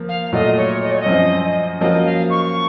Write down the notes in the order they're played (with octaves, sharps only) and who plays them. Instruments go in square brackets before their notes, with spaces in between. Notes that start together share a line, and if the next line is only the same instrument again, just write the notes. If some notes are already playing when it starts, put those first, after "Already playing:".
Already playing: [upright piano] F3 A#3
[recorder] F5
[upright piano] A#2 F#3 A3 [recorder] D#5
[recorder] C#5
D#5
C#5
D#5
[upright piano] F#2 F3 C4
[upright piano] F3 A#3 C#4 F#4 [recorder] D#5
[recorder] F5
C#6